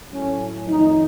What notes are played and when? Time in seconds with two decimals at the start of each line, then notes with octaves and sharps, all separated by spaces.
0.12 A2 F#3 A3 C#4
0.67 F2 D#3 A3 D#4